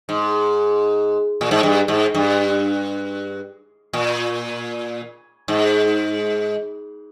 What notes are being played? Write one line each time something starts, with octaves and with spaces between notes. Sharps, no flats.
G#2
A#2
G#2
G2
G#2
G2
A#2
G#2